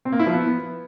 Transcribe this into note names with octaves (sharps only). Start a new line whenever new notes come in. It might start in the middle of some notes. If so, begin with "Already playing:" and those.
C4
A#3
E4
F3
B3